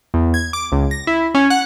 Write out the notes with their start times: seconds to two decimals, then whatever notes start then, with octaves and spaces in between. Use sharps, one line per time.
0.14 E2
0.34 G#6
0.53 D6
0.72 C#2
0.91 A#6
1.07 E4
1.35 C#4
1.50 F#5